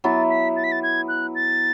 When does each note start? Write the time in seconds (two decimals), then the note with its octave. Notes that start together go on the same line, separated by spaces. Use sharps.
0.04 F#3 B3 E4 A6
0.30 B6
0.56 A6
0.64 B6
0.72 A6
0.83 G#6
1.08 F#6
1.35 A6